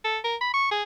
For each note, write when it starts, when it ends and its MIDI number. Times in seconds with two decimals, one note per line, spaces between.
0.04 0.19 69
0.24 0.36 70
0.41 0.49 83
0.54 0.68 85
0.71 0.83 68